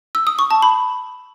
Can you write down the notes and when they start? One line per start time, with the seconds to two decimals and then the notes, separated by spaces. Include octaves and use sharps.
0.15 E6
0.27 D#6
0.39 C#6
0.51 A5
0.62 B5